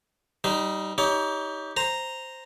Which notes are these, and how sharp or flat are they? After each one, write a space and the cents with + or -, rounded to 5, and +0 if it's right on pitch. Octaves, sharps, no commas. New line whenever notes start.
G3 -20 D#4 +0 C5 -45
D#4 +25 G4 +0 C#5 +30
C5 +0 A#5 -5